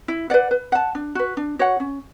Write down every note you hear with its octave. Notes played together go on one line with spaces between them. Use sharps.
E4
B4 D5 F#5
B4
F#5 A5
D4
F#4 B4
D4
F#4 C#5 F#5
C#4